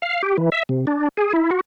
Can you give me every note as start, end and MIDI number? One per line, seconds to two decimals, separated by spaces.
0.02 0.22 77
0.23 0.37 67
0.38 0.50 52
0.52 0.63 76
0.69 0.85 48
0.87 1.08 62
1.17 1.33 68
1.33 1.50 64
1.51 1.61 66